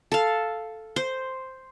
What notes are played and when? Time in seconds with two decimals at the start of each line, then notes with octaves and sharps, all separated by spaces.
0.12 A4 F5
0.96 C5